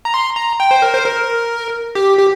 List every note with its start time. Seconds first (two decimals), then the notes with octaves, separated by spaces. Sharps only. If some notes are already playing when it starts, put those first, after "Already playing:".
0.05 A#5
0.14 C6
0.36 A#5
0.60 G5
0.71 C5
0.82 A#4
0.94 C5
1.05 A#4
1.95 G4
2.18 G4